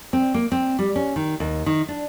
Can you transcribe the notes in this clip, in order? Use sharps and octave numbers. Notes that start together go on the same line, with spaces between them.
C4
A#3
C4
G3
C#4
D#3
D#2
D#3
D4